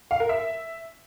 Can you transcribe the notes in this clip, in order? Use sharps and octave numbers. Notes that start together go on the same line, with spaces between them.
F5
A#4
E5